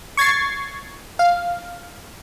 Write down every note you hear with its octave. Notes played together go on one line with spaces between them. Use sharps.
C#6 G#6 A6 C7
F5